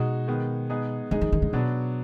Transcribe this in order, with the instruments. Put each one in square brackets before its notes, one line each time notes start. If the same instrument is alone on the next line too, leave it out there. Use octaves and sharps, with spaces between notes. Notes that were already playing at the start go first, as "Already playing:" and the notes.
Already playing: [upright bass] B2 [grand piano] G#3 D#4 F#4
[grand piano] D#3 G#3 B3
G#3 B3 D#4 G#4
[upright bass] D3 [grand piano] G#3 D#4 G#4
[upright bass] D#3
D#3
D3
[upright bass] B2 [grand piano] F#3 B3 D4